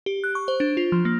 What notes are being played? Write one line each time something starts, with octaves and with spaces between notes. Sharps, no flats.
G4
F#6
C#6
C5
D4
F4
F3
A#3